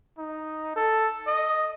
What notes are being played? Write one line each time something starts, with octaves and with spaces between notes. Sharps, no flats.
D#4
A4
D#5